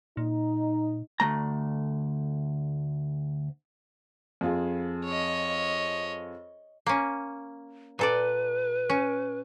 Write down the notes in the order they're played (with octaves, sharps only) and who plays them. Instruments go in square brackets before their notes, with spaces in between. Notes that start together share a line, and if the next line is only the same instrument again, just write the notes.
[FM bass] A#2 [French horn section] D#4
[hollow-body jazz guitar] D2 A3 A#5
[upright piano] F2 F4 G#4
[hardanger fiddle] C#5 D#5
[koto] A#3 C#4
[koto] A#2 A4 D5 [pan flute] B4
[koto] C#4